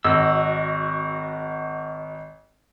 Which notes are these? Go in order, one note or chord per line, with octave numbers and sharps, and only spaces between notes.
G#1 F#4 D#5 E6